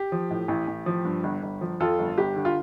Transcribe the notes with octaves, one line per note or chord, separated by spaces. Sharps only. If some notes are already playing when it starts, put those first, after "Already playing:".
Already playing: G4
F3
A2
A1
A1
F3
G2
G1
G1
F3
F2 F4 A4
G1
G1 G4
D3
F4